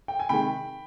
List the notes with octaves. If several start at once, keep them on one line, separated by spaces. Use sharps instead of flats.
G5
G#5
C3 D#3 G#3 G5 B5